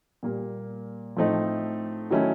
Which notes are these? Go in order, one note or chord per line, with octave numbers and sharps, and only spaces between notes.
A#2 G3 A#3
A2 F3 A3 C4 D#4
D#3 F#3 A3 C#4 E4